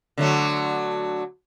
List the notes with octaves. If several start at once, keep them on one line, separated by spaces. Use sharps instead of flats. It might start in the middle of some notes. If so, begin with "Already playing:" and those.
D3 F#3 A3